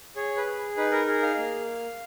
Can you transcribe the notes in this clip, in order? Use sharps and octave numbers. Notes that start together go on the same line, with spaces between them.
G#4 C#5
B4
G#4
D#4 B4
A#4
G#4 A#4
F5
A#3